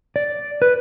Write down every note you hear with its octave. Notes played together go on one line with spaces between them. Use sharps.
D5
B4